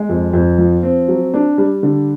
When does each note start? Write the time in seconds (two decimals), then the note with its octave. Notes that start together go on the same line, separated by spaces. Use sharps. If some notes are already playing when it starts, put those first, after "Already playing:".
Already playing: G#3
0.09 F2
0.33 F2
0.58 F3
0.83 C4
1.08 F#3
1.34 D4
1.58 G3
1.83 D3